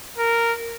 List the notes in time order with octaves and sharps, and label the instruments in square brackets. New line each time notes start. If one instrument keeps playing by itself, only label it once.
[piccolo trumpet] A#4